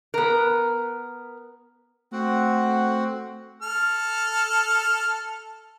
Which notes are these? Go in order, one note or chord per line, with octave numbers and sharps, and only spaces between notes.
B3 A#4
A3 C4 F#4 F#5
A4 F6